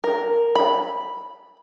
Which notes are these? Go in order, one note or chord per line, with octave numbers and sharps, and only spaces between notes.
A#4
B5